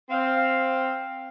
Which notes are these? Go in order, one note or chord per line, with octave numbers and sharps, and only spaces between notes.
C4 F5